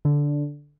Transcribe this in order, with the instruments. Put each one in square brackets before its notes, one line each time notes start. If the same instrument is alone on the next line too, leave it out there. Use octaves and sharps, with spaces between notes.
[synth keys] D3